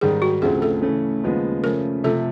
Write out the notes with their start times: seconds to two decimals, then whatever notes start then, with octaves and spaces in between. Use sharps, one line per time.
0.01 G#2 D#3 G3 G#4
0.22 F#4
0.42 D2 C#3 F3 A3 C4 G#4
0.62 A4
0.82 C#3 E3 A3 C#4
1.24 D#2 C#3 F3 G#3 B3
1.63 C#3 F3 A3 C#4 A#4
2.04 C3 F3 A3 A4